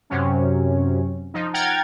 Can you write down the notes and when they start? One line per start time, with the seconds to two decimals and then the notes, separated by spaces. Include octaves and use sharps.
0.10 F#2 C3 F#3 C#4
1.34 F3 D#4
1.53 F#5 G5 A#5 F6 G#6 A6